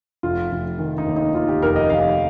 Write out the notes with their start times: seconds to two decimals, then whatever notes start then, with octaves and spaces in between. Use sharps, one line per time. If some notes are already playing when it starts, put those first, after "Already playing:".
0.23 F1 F4
0.52 F1
0.79 D#3
0.98 D#4
1.06 D#2
1.16 D#4
1.34 D#2 F4
1.48 G4
1.62 F1 A#4
1.76 D#5
1.90 F1 F5